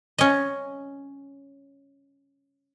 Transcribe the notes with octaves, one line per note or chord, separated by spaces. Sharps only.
C#4 D#5